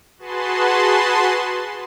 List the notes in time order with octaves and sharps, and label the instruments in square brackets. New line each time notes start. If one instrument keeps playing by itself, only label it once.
[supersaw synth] F#4 G#4 B4 A5 C6